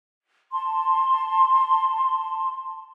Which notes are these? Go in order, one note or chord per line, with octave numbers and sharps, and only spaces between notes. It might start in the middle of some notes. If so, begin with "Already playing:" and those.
A5 C6